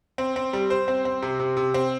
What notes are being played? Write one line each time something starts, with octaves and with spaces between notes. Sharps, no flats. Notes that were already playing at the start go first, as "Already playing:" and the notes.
C4
C4
G3
C5
C4
C4
C3
C3
C3
C4